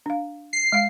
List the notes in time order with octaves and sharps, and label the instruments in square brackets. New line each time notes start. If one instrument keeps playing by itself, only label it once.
[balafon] D4 F5
[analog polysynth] C7
[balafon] G#3 F5